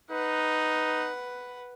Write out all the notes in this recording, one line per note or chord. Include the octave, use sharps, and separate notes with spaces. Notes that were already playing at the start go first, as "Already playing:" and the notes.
D#4 B4 F#5